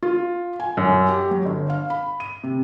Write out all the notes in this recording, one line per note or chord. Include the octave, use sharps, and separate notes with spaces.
F4
G#5
F#2
G4
F#3
G1
F5
B5
D#7
C3